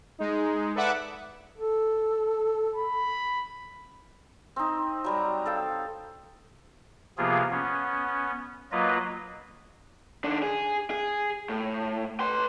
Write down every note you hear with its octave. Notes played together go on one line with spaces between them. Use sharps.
G#3 D#4
A4 B4 D5 E5 F#5 D6
A4
B5
C4 D#4
F#3 G3 A#5
A4 F5 G5
C3 F3 A#3 B3 F4 G#4
B3 C#4
F#3 A#3 F4 B4 D#5
D#3 D4
G#4
G#4
A2
B4 C6